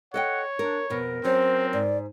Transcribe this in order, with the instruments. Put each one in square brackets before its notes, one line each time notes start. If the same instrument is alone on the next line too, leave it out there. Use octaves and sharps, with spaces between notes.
[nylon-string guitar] A4 D#5 G5 [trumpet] C#5 [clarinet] F#5
[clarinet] D4 [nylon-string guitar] A#4
[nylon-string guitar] F2 B2 [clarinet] A#4
[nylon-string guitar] F#3 C#4 [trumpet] C4 [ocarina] C5
[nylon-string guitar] G#2 [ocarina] D5